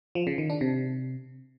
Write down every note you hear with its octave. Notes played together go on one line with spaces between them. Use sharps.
F3
C#3
D#3
D4
C3